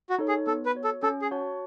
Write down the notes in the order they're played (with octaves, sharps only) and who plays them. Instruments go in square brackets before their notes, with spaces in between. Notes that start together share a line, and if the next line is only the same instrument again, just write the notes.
[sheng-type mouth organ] F#4
[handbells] D#4 A4 C#5
[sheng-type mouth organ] G#4
[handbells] B3 [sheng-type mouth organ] A4
[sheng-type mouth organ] B4
[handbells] F#4 C#5
[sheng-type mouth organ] A4
[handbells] C#4 [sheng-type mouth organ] A4
[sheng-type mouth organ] G#4
[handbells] F#4 C#5 F#5 A5